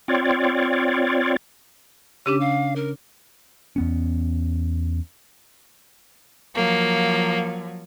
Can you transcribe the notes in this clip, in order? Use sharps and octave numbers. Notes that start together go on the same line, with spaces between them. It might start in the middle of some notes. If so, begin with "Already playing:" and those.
C4 F4 C#5 D5
C#3 C#4 D4 G4
F5
A#4
E2 B3 C#4
F3 F#3 A#3